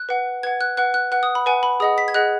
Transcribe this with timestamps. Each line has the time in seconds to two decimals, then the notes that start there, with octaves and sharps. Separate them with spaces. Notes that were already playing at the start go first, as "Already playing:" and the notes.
Already playing: F#6
0.09 B4 F#5
0.43 B4 F#5 G#6
0.61 F#6
0.77 B4 F#5 F#6
0.94 F#6
1.12 B4 F#5 F#6
1.23 D#6
1.35 B5
1.46 B4 F#5 G#5
1.63 B5
1.80 G#4 D#5 F#5 D#6
1.98 B6
2.08 G#6
2.14 G#4 D#5 F#5 F#6